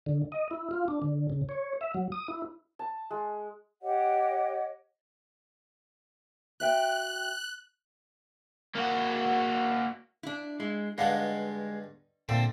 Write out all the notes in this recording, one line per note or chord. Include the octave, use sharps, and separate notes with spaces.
D3
D#5
E4
F4
D4
D3
C#3
C#5
E5
F#3
D#6
E4
A5
G#3
G4 C#5 D#5 F#5
F#4 E5 G5 F#6
A#3 F#4
D4 E4
G#3 E4
G2 D3 G#3 D#4 B4 F5 F#5
A#2 D3 A3 C4